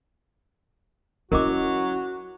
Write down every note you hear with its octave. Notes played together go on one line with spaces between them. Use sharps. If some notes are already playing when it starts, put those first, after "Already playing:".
F#3 C#4 E4 F#4 A#4 D#5 D6